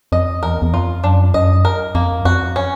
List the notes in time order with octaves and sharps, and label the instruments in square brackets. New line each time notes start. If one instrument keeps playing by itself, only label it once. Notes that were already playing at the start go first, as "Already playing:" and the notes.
[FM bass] F2 [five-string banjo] D#5
[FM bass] E2 [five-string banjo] A#4
[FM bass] E2
[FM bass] F2 [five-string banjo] F4
[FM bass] F#2 [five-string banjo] D4
[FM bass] F#2 [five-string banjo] D#5
[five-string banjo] A#4
[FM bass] F2 [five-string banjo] A#3
[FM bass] F2 [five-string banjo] F#4
[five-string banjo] C#4